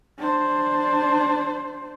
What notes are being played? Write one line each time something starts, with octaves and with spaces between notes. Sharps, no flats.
D4 C5